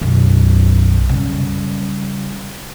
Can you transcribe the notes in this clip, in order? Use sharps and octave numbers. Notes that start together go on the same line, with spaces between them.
B1 F#2
C#3 G3